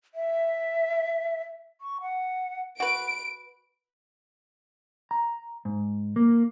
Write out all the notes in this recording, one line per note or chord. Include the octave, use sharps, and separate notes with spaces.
E5
C#6
F#5
F#4 B4 D7
A#5
G#2
A#3